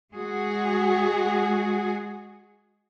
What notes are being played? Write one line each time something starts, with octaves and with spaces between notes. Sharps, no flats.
G#3 F#4 G#4